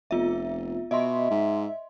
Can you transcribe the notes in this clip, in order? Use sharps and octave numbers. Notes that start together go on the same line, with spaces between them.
F1 B3 F4 E5
B2 D#5 E5 C6
G#2